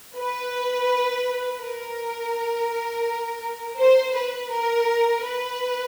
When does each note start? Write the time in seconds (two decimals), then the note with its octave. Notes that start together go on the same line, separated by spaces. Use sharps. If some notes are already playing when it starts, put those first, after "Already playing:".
0.16 B4
1.60 A#4
3.78 C5
4.15 B4
4.51 A#4
5.24 B4